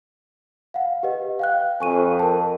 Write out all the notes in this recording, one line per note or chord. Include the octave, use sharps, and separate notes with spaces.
F5 F#5
G4 B4 D#5
F5 G5 F#6
F2 G#5 C#6 D#7
A#4 A5